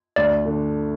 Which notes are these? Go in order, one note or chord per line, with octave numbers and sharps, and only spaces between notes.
D2 D5
D3 A3 D4